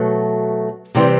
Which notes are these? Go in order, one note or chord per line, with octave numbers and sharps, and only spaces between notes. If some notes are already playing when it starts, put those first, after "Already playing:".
Already playing: B2 F#3 A3
C3 E3 G3 C4